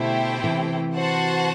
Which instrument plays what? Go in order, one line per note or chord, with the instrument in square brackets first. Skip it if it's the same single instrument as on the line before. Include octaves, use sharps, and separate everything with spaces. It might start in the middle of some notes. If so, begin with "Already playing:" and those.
Already playing: [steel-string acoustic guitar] B2 D3 [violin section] A3 E4 G4 C5 G5
[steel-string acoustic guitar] C3 E3
[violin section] F#4 C5 F#5 A5